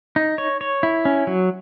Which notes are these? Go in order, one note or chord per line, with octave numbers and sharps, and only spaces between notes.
D#4
C#5
C#5
E4
C#4
F#3